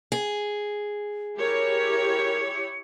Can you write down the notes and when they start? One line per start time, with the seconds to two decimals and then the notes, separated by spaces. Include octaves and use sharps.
0.12 G#4
1.39 E4 G4 A#4 C#5 C#7